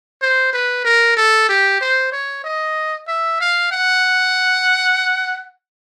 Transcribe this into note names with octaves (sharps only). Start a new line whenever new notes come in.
C5
B4
A#4
A4
G4
C5
C#5
D#5
E5
F5
F#5